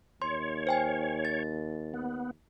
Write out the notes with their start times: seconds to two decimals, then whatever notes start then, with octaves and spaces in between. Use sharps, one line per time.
0.22 D#2 C#5 C6
0.67 C5 G5 G#5
1.25 A6
1.94 B3